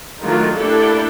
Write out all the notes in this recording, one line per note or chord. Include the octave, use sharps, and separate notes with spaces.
D#3 F#3 G#3 A3 D4 F4
A3 A#3 D4 E4 G4 A4